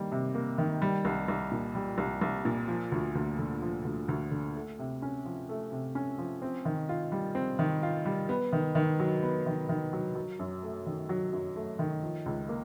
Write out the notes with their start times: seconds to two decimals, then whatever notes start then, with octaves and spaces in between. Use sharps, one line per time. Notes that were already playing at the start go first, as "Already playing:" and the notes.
Already playing: D#3 G3 A#3
0.12 C3
0.35 A#3
0.58 D#3
0.82 G3
1.05 C2
1.28 C2
1.52 A#2
1.75 G3
1.98 C2
2.21 C2
2.45 A#2
2.68 F3
2.92 D2
3.15 D2
3.39 D3
3.62 F3
3.85 D2
4.08 D2
4.31 D3
4.56 A3
4.79 C3
5.02 C#4
5.25 F3
5.49 A3
5.72 C3
5.95 C#4
6.18 F3
6.42 C4
6.65 D#3
6.89 F4
7.12 G3
7.35 C4
7.59 D#3
7.83 F4
8.06 G3
8.29 B3
8.53 D#3
8.75 D#3
9.00 F#3
9.23 B3
9.46 D#3
9.69 D#3
9.93 F#3
10.15 F#3
10.39 F#2
10.63 A3
10.86 D#3
11.09 F#3
11.33 F#2
11.56 A3
11.79 D#3
12.02 F3
12.26 C#2
12.49 A#3